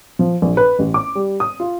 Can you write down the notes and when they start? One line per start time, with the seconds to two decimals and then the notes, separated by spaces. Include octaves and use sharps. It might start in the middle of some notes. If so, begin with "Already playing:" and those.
0.19 F3
0.42 A#1
0.57 B4
0.79 A1
0.94 D6
1.15 G3
1.40 D#6
1.60 F4